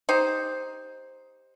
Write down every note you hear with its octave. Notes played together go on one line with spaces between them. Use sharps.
D#4 G4 C5